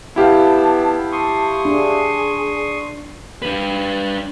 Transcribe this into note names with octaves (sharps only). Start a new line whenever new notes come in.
B3 E4 G4 F5 A5
A5 C6 C#6 D#6
D4 G#4
D4 B4